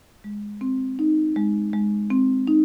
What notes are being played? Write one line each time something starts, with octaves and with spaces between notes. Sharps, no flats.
G#3
C4
D#4
G#3
G#3
C4
D#4